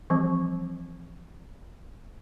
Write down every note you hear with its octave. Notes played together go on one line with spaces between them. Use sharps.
E3 F3 G3 C4